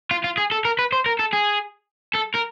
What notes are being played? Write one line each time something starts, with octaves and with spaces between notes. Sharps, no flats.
F4
F4
G#4
A4
A#4
B4
C5
A#4
A4
G#4
A4
A#4